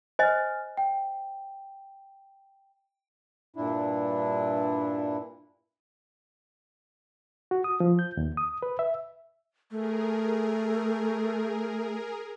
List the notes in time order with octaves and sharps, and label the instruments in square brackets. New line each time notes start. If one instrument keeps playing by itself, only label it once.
[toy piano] C5 D#5 [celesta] G#5 F6
[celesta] G5
[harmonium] G2 A#2 D4 E4
[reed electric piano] F#4
D#6
F3
G6
D#2
D#6
B4
E5
[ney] A3 [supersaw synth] G#4 A#4